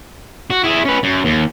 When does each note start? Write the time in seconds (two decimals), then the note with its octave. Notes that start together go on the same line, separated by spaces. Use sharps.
0.50 F#4
0.64 E4 G#4
0.86 C#4 B4
1.04 F#2
1.25 D#2